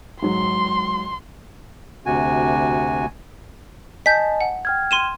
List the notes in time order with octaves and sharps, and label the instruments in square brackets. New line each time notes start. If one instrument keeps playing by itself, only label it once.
[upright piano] G#2 F#3 [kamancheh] C6
[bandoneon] D2 C3 F#4 G#5
[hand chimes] D#5 G#5 A5 [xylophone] G6 B6
[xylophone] F#5
[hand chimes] G5 F6 G#6
[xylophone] C6 D#7 E7